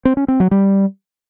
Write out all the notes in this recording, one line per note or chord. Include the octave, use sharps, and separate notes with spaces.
C4
C#4
C4
F#3
G3